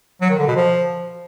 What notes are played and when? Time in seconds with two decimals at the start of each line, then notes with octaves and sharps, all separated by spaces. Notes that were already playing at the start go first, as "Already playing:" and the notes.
0.21 F#3
0.30 D#3
0.39 D3
0.47 B2
0.56 F3